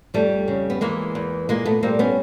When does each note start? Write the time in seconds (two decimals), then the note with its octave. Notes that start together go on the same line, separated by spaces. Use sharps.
0.14 F2 G3 A3
0.48 C#3
0.70 B3
0.81 E3 G#3 A#3
1.15 E2
1.49 A#2 G#3 A#3
1.66 A3 B3
1.83 G3 A#3 C4
1.99 B3 C#4